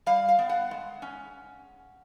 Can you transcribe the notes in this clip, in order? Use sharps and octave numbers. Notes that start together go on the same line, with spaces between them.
G3 F5
F5
B3
F#5
G#3
C#4